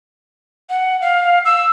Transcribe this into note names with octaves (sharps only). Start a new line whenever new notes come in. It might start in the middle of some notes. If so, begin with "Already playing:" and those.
F#5
F5
E6